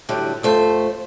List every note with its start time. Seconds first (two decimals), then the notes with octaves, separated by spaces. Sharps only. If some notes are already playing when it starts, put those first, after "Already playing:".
0.09 A2 D3 F#3 G3
0.43 F2 A3 C5